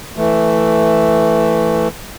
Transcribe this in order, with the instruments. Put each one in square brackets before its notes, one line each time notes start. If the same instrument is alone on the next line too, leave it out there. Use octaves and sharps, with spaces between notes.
[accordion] E3 A3